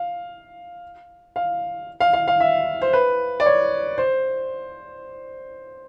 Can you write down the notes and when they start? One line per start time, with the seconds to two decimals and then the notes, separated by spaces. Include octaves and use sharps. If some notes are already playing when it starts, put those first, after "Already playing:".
Already playing: F5
1.36 F5
2.00 F5
2.13 F5
2.28 F5
2.40 E5
2.82 C5
2.93 B4
3.40 D5
3.46 C#5
3.98 C5